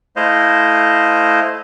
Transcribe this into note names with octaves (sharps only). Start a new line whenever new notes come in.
A3 E4 C5 D#5 F5